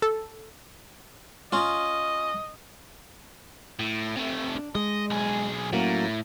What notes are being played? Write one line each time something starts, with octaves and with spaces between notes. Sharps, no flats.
A4
C#4 F4 D#5
A2
C3 A3
D4
G#3 D#5
B1 G#4
A2 F#3 A#3 C#4